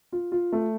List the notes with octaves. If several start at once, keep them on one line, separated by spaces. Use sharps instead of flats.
F4
F4
A3